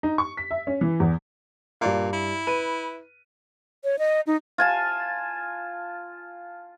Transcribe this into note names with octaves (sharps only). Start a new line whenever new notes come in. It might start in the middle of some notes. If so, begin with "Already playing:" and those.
D#4
C#6
B6
E5
C#4
E3
E2
G2 A#2 D5 F5
E4
B4 D#7
C#5
D#5
D#4
F4 G#5 A5